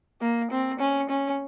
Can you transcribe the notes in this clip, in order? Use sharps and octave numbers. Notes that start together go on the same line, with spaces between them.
A#3
C4
C#4
C#4